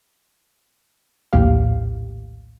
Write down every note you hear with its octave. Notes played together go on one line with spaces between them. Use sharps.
A#1 D#2 A2 G4 F5